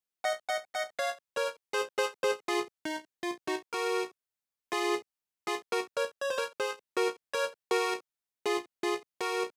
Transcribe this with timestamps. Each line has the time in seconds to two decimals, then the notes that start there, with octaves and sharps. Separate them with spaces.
0.24 D#5 F#5
0.49 D#5 F#5
0.75 D#5 F#5
0.99 C#5 F5
1.36 A#4 C#5
1.73 G#4 C5
1.98 G#4 C5
2.23 G#4 C5
2.48 F4 G#4
2.85 D#4
3.23 F4
3.47 D#4 F#4
3.73 F#4 A#4
4.72 F4 G#4
5.47 F4 G#4
5.72 F#4 A#4
5.96 A#4 C#5
6.22 C#5
6.30 C5
6.38 A#4 C#5
6.59 G#4 C5
6.97 F#4 A#4
7.34 A#4 C#5
7.71 F#4 A#4
8.46 F4 G#4
8.83 F4 G#4
9.21 F#4 A#4